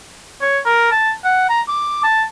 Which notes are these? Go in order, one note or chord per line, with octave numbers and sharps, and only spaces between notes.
C#5
A#4
A5
F#5
A#5
D6
A5